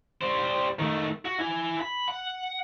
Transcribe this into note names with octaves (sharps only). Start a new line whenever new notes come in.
G3 C5
D#3 A3
F#4
E4 G#5
B5
F#5